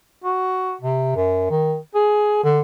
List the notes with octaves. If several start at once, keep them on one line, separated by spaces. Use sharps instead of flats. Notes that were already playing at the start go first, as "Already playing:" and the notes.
F#4
C3
F#2
D#3
G#4
D3